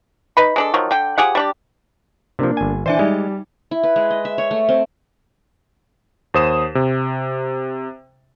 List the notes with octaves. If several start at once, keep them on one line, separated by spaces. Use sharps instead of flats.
D#4 B4 B5
G#3 D4 A4
D#3 F3 F#3
D3 G5
F3 G4 G#4 F#5
G3 D4 G4
C3 F3 A#3 D4
G1 G#5
E3 D4 C5 D5 E5 G#5
G3 G#3 D#4
E4
B4
G#3
D#5
E5
C#5
A3
C4
D#2 C5 D#6 E7
C3